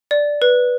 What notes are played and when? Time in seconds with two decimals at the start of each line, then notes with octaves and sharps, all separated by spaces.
0.11 D5
0.42 B4